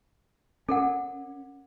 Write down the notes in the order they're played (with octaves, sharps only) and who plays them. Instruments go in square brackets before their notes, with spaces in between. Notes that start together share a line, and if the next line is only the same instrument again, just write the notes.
[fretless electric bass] C#4 [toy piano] A4 A#4 F#5